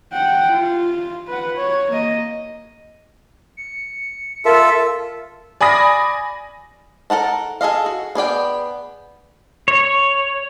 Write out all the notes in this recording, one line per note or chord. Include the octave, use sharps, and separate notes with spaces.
F#5 G5
F4
B4 F#5
C#5
A#3 D#5
C#7
F4 A4 A#4 E5
D5 G#5 B5 D#6 A#6
A4 A#4 F#5 A5
G#4 A4 D#5 F5
F#4
B3 G#4 D5 G5
C#5